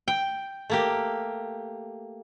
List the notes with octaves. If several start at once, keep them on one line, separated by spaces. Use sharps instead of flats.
G5
A3 A#3 G4